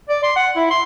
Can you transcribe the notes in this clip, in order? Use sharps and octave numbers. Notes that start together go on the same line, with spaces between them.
D5
C6
F#5
E4
C6